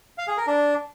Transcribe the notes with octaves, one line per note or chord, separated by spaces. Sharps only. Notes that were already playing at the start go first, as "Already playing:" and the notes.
F5
G#4
A#4
D4